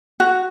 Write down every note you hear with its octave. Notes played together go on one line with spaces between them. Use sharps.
F#4